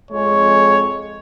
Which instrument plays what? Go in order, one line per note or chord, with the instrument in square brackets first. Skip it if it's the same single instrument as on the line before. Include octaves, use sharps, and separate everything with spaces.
[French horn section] F2 G#3 [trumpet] C#5